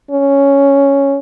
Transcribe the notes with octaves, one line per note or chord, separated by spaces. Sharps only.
C#4